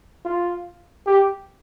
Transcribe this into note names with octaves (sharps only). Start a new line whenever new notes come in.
F4
G4